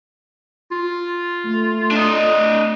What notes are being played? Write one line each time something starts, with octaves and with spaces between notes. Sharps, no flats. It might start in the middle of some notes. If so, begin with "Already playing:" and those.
F4
A3
D4 D#5